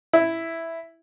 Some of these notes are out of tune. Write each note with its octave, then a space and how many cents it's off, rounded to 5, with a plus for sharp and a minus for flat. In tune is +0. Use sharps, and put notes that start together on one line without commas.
E4 +0